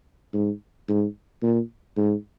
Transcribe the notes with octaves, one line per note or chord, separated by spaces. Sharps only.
G#2
G#2
A#2
G#2